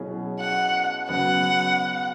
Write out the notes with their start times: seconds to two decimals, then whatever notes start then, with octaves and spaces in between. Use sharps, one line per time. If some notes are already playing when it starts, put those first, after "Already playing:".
Already playing: B2 F#3 C#4 E4 G#4
0.40 F#5
1.08 C#3 F#3 B3 F#5